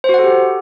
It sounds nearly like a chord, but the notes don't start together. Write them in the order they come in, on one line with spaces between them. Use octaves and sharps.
C5 F#4 F#5 A4 G4